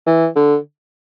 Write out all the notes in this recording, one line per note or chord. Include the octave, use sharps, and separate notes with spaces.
E3
D3